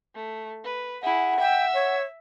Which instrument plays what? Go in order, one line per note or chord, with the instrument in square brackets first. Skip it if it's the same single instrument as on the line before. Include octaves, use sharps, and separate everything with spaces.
[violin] A3
B4
[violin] E4 G#4 [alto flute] F#5
[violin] E5 E6 [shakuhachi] G5
[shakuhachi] C#5